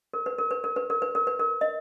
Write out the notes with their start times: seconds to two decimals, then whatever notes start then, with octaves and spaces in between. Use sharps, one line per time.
0.14 A#4
0.26 B4
0.38 A#4
0.51 B4
0.64 A#4
0.76 B4
0.90 A#4
1.02 B4
1.15 A#4
1.27 B4
1.39 A#4
1.61 D#5